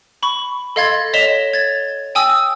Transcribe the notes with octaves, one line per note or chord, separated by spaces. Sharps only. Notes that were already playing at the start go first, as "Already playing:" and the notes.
B5 C#6
A4 D#5 F5 C6 G#6 A6
C#5 D#5 B6 E7 F7 G7
G#6 A6
G5 G#5 D#6 E6